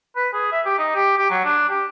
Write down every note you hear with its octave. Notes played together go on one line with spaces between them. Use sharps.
B4
G#4
E5
G4
D#4
G4
G4
F#3
D4
G4